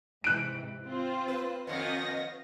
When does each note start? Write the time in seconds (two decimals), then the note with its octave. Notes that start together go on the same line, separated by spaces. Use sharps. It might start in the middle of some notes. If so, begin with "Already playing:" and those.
0.24 G#2 C3 E3 F#6 D7
0.88 C4 F4 C5
1.28 B4
1.67 F2 D#3 B3 D#5 F5 A#6